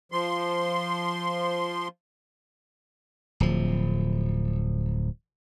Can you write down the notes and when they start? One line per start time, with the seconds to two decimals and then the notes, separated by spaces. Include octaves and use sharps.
0.12 F3 C6
3.40 D1 F3